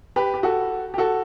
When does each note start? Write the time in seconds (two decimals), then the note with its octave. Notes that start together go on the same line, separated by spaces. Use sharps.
0.16 G4 B4
0.34 G4
0.43 F#4 A4
0.94 G4
0.98 F#4 A4